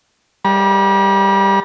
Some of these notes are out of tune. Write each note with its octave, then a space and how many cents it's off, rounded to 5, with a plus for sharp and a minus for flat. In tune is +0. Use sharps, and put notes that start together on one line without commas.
G3 +10 B5 -45